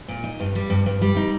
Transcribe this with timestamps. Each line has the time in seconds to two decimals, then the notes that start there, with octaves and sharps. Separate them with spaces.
0.08 A#2
0.24 D#4
0.40 G2
0.55 G3
0.70 G2
0.86 G2
1.01 G3
1.16 D#4